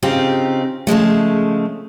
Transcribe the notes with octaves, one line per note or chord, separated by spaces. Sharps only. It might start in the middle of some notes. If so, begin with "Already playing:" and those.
C#3 C4 D#4 F4 G4
C#3 F3 G#3 A3